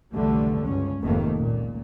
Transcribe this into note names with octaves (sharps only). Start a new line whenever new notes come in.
B1 E2 D3 G3 A3
C#2 G2 C#4
F1 F2 G#2 D#3 A3 A#3
C#2 A#2